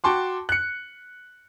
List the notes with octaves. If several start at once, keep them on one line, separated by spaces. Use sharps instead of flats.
F#4 G5 A5 C6 D6
F#6 C#7